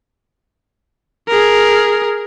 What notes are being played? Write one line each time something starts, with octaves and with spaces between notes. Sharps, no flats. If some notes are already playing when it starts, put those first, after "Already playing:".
G#4 A#4